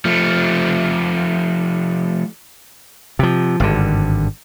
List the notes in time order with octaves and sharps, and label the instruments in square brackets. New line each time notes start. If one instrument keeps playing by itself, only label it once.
[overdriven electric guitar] F3 A3
[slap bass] C3 F3
G#1 G2 D3